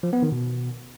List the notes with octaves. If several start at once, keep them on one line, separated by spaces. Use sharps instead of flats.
F3
B3
D#3
B2